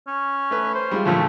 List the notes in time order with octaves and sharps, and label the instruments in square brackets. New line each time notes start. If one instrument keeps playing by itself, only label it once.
[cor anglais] C#4
[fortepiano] A3 B4
[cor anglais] C5
[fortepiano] G3 G#3 F4
[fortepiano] D2 A#2 F3 [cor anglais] A3